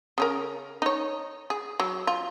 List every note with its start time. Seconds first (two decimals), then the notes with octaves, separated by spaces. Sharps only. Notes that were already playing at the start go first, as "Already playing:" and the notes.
0.18 C#3 C#4 A#4
0.82 D#4 C#5
1.50 G#4
1.80 F#3
2.07 F4